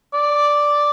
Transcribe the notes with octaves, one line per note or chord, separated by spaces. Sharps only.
D5